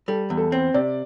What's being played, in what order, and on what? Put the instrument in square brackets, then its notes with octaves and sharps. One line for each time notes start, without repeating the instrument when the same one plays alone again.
[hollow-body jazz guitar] G3 [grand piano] A4
[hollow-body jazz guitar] E2
[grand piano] A4
[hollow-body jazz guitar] C4 [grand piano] C5
[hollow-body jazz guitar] C3 [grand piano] D5